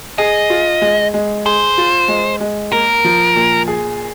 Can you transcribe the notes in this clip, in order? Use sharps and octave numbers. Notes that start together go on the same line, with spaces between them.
G#4 D#5
F4
G#3
G#3
G#4 C5
F4
G#3
G#3
A#3 A#4
F3
A#2
G#4